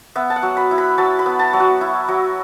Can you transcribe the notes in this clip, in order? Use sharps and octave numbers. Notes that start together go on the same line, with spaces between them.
B3 E5
A5
F#5
F#3
B5
E4
B5
F#3 A5
B5
B3
A5
F#3
F#4
E4
F#3